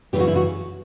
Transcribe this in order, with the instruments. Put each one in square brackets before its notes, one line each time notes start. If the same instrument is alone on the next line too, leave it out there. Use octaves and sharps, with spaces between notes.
[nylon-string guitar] F#2 C#3 E3 G3 G4
F#4
E4
F#4